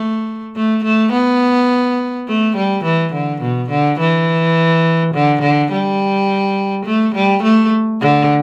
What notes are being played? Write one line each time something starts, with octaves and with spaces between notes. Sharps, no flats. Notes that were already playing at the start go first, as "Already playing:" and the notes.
Already playing: A3
A3
A3
B3
A3
G3
E3
D3
B2
D3
E3
D3
D3
G3
A3
G3
A3
D3